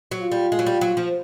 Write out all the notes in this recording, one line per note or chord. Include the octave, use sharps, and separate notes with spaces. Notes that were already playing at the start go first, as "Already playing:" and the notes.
F#3
F4
G3
G#3
F#3
G3
F#3
F3